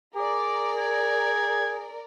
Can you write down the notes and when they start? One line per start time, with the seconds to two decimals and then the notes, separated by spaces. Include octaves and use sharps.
0.15 G#4 A#4 D5 D6
0.79 G#6